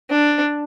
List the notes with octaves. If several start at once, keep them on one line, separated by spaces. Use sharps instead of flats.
D4